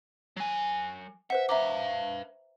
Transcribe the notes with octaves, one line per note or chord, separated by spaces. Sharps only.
F#3 G#5
B4 C5 E5 F#5
B4 E5 F5 A#5 D6